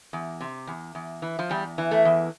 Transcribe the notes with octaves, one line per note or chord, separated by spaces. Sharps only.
E2
C3
E2
E2
E3
F3
E2 G3
E3
A3
E2